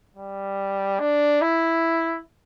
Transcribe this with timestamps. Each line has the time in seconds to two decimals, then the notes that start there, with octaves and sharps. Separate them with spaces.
0.17 G3
1.00 D4
1.42 E4